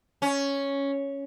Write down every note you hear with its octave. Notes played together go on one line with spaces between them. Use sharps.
C#4